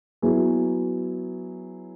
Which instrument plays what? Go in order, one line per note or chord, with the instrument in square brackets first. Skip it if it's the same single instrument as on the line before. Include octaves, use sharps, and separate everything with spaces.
[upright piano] F#3 B3 E4 G#4